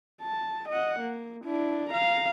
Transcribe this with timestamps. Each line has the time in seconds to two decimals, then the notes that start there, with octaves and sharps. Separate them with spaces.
0.22 A5
0.69 D#5 F#5
1.00 A#3
1.44 D4 E4
1.90 F5 A#5